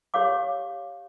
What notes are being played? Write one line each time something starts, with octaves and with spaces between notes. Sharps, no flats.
G4 C5 C#5 F5 D6